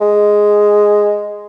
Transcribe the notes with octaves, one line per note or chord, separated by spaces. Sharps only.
G#3